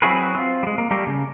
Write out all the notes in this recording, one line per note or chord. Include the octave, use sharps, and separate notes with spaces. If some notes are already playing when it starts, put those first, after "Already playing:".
F#3 C4 E4 F#4 G#4 B4
C4 F4
G3 G#3
A#3
G3 A3 A#3 G4 A#4
C#3